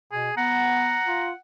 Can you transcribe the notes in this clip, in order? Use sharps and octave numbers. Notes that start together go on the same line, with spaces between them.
B2 G#4
B3 F#5 A#5
F4